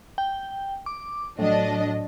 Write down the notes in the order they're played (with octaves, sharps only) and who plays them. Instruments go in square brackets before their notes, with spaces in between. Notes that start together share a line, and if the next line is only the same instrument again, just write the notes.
[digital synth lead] G5
D6
[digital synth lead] A2 [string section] F#3 D4 D#5